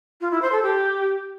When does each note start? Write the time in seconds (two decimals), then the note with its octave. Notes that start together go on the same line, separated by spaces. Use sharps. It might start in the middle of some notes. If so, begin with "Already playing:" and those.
0.21 F4
0.31 E4
0.42 C5
0.52 A4
0.63 G4